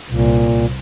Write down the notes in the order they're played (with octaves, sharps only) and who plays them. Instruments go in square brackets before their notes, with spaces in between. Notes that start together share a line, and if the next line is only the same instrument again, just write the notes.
[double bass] C2 [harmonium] A#2